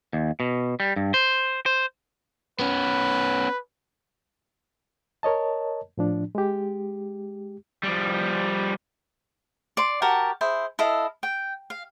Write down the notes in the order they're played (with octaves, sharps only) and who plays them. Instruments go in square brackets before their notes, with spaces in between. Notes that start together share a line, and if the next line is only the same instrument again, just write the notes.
[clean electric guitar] D#2
B2
G3
G2
C5
C5
[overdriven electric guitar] B3 C#4 [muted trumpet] B4
[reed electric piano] A#4 C#5 D#5 A5
A2 F3 D4
G#3 G4
[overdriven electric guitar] F3 G3
[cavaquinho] D5 C6
F#4 G4 A#4 A5
E4 G#4 C5
E4 A4 D#5 F5
G5
F5